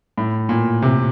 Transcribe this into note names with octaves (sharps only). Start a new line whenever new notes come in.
A2
A#2
C3